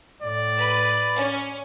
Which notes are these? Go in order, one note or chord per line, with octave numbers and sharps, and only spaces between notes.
A2 D5
B4 B5
C#4